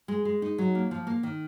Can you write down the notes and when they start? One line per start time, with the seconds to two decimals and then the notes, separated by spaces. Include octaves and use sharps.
0.08 G#3
0.25 G#3
0.42 D#4
0.58 F#3
0.75 A#3
0.91 F3
1.07 A#3
1.23 D#3